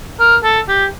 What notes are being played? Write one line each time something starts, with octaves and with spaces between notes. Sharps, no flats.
A#4
A4
G4